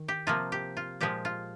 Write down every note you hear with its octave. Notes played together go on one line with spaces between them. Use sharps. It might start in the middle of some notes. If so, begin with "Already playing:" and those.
Already playing: D#3
G4
C3 F3 A#3 F4
G4
F4
A#2 F3 G#3 G4
F4